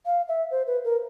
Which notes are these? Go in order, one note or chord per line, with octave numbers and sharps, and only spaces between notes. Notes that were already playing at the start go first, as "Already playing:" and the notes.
F5
E5
C5
B4
A#4